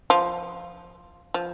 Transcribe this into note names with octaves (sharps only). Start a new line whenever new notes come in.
F3
F3